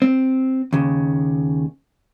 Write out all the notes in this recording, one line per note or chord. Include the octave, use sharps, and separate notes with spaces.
C4
D#2 C#3